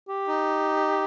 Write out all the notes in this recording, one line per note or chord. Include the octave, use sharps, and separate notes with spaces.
G4
D#4